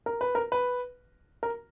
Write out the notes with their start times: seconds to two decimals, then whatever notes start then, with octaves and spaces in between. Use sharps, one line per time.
0.06 A#4
0.21 B4
0.35 A#4
0.52 B4
1.43 A#4